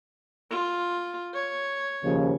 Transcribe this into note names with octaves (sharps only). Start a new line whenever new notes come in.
F4
C#5
D#2 C#3 F3